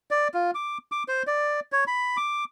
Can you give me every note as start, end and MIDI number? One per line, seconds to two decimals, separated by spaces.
0.11 0.28 74
0.34 0.51 65
0.55 0.78 86
0.92 1.03 86
1.08 1.23 72
1.27 1.60 74
1.72 1.84 73
1.87 2.17 83
2.17 2.44 86